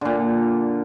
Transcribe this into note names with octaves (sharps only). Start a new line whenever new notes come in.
A#2 D3